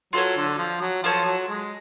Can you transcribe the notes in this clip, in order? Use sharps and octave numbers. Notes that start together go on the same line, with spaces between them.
F#3 F4 A4 C#5
D3
F3
F#3
F3 F4 A4 C#5
F#3
G#3